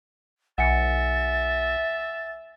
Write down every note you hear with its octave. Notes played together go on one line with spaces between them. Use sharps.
B1 E5 F#5 G#5 A6 C#7